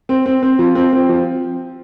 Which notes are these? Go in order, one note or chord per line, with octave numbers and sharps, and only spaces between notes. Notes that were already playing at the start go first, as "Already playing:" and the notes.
C4
C4
C4
F3
C4
C4
F3